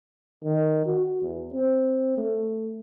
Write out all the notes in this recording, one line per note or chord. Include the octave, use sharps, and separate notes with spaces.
D#3
F#4
E2
C4
A3